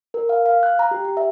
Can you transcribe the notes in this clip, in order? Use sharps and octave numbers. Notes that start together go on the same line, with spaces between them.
A#4
F5
F5
F#6
A#5
G4
G4
E5